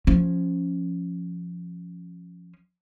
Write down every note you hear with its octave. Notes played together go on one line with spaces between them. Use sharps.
F3 C#4